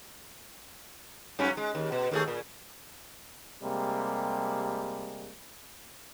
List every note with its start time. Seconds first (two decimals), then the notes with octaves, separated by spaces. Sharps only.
1.39 G2 F#3 C#4
1.57 G#3
1.75 D#2
1.92 B2
2.11 D#2 A3 G#4
2.28 A#2
3.63 C3 G3 G#3 A#3